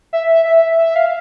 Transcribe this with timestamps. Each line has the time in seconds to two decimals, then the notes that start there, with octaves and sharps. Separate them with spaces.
0.13 E5
0.46 E5
0.79 E5
0.96 F5